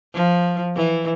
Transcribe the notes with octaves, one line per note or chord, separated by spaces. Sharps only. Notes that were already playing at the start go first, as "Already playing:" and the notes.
F3
E3